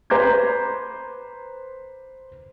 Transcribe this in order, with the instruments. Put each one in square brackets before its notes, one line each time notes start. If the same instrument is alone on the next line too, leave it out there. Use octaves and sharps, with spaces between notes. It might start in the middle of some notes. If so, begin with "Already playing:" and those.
[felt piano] B4 C5 A#5 D6 G6 G#6